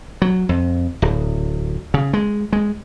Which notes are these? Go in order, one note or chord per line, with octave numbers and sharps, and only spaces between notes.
F#3
F2
D1
C#3
G#3
G#3